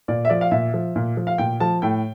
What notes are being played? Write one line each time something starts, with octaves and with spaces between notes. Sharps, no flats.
A#2 D5
E5
F3 D5
F5
A#2 E5
F3
A#2
F3
F5
A#2 G5
F3 A5
A2 G5